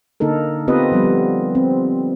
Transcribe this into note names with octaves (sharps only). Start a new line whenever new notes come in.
D3 A#3 D#4 A4 A#4
B3 C4 F4 G4 B4 D#5
F3 G3 B3
C4